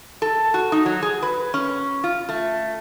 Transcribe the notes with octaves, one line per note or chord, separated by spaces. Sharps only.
A4
F#4
D#4
F#3
G#4
B4
C#4
F4
A3